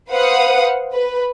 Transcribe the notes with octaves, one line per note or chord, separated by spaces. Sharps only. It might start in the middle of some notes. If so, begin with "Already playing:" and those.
B4 C5 F5 F#5 D#6
B4